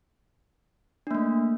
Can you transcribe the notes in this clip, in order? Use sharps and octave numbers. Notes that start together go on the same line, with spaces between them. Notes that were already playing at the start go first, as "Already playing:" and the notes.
A3 A#3 D4